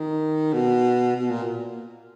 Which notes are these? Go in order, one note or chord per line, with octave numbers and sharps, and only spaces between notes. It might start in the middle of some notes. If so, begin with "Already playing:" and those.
Already playing: D#3
B2
B2
A#2